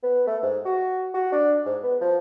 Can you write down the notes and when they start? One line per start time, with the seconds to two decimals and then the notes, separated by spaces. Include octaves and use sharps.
0.03 B3
0.27 A3
0.43 G#2
0.65 F#4
1.14 F#4
1.32 D4
1.65 G#2
1.83 B3
2.01 F3